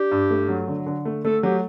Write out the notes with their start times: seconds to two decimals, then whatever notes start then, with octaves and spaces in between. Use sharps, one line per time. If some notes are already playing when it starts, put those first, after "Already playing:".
Already playing: D4 G4
0.11 G2
0.30 A3
0.49 F#3
0.68 D3
0.86 D3
1.06 A3
1.24 A3 A4
1.43 F#3 G4